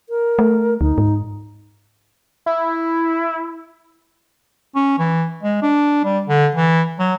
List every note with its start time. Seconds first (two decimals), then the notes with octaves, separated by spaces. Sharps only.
0.09 A#4
0.39 A3
0.81 D2 D#4
0.98 G#2
2.46 E4
4.76 C#4
4.99 E3
5.43 G#3
5.62 D4
6.04 G3
6.27 D3
6.55 E3
6.99 F#3